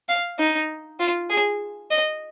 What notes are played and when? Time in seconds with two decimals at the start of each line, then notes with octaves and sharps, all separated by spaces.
0.09 F5
0.39 D#4
1.00 F4
1.30 G#4
1.91 D#5